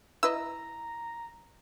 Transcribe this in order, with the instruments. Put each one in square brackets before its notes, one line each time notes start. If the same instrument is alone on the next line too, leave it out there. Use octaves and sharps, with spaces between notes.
[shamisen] E4 B4 D#5 [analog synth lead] A#5 [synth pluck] E6